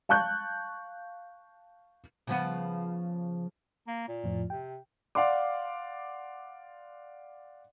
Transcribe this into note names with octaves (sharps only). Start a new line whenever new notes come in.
F5 A5 C#6 F#6 G6
C#3 F3 B3
A#3
A#2
F2 A2 F3
C3 G5
D5 F5 F#5 C6 D6